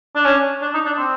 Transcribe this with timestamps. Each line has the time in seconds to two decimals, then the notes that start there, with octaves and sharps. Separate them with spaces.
0.15 D4
0.25 C#4
0.62 D4
0.74 D#4
0.85 D4
0.98 C4